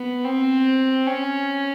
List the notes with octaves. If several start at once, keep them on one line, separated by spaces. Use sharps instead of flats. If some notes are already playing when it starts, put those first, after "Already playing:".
Already playing: B3
C4
C#4